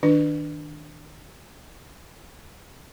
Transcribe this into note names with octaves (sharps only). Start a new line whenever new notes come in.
D#3 D4 B4